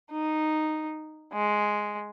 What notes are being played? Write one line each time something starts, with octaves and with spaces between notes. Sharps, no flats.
D#4
G#3